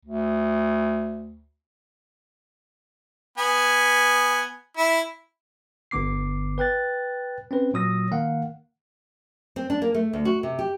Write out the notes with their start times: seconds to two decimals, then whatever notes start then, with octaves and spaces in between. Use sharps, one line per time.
0.05 D2
3.38 B3 G#5
4.77 E4
5.91 G1 D3 B3 D6 C7
6.58 B4 G5 F#6 A6
7.51 C4 C#4 B4
7.74 A#2 F#3 D#6 E6 A#6
8.11 D#3 A#3 F5 F#5
9.56 C4
9.70 D4
9.82 A#3
9.94 A3
10.13 D2
10.25 F#4
10.43 C3
10.59 G4